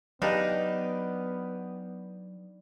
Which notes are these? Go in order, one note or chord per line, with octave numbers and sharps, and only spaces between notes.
F#3 B3 D4 D#4 G4 B4 F5